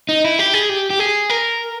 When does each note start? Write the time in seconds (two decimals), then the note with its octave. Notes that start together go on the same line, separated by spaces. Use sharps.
0.09 D#4
0.24 E4
0.39 G4
0.54 G#4
0.69 G4
0.90 G4
0.99 G#4
1.30 A#4